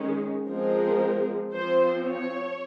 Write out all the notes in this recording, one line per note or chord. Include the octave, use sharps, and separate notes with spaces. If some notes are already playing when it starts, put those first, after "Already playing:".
Already playing: D#3 G#3 C#4
F3 G#3 C4 A#4
F3 C4 C5
C#5